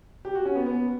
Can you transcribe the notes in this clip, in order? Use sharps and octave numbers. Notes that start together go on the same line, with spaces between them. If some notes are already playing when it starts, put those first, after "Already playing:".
G4
F#4
C#4
B3
B3